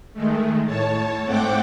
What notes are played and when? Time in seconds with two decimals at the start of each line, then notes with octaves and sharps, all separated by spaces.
0.13 D#3 G#3 A3
0.66 A2 C#5 A5
1.23 G#2 A3 C4 F#5 G5 D6